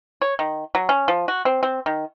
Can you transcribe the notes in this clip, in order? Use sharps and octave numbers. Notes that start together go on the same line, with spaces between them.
C#5
D#3
F#3
C#4
F3
F#4
C4
C4
D#3